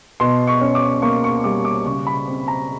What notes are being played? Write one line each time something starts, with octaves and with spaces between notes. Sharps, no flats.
B2 C6
C#6
C#4
D6
A#3 C#6
C#6
G3 D6
D6
C#3 C#6
B5
C4
A#5